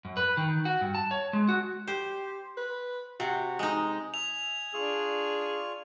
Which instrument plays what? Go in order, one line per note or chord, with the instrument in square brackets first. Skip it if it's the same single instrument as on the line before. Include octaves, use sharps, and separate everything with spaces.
[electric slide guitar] F#2
B4
D#3
F#4
G2
A5
C#5
G#3
F#4
[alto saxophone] G4 [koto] C5
[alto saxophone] B4
[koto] C3 [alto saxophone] F#4
[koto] G#3 D#4
[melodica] E5 G#5 D#6 [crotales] F7
[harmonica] D4 [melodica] F4 C#6 [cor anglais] G#4